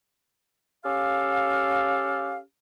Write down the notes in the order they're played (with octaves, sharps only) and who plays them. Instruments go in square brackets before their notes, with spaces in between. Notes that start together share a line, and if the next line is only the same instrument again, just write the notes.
[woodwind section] C#4 G4 A4 F5